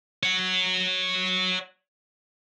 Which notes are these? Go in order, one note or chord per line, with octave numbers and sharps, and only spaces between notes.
C#5 F#5